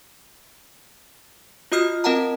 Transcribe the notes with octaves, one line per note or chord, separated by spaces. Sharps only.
F4 F#4 D#5 D#6 F6 C7
C4 A#4 D#5 F#5 A5 A#5